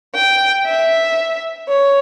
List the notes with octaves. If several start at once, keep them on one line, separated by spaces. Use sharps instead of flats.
G5
E5
C#5